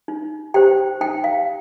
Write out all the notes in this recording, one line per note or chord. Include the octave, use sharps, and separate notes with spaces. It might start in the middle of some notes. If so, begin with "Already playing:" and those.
D#4
G4 C5 G5
D#4 G5
F5